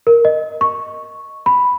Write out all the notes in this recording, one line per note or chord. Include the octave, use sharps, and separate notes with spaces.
A#4
D#5
C#6
B5